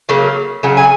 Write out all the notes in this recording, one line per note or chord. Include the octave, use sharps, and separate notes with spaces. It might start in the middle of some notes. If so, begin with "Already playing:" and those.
C#3 F#3 A#3
C#3 F#3 F#5
G#5